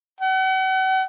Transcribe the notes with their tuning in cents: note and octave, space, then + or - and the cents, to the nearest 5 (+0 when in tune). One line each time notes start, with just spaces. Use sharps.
F#5 +40